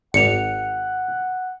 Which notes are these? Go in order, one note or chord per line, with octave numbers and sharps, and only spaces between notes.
G#1 F#5 C#7 F7